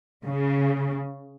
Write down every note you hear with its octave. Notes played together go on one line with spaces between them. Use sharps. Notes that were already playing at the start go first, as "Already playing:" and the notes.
C#3